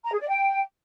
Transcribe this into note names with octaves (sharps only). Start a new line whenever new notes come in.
A#5
G#4
D5
G5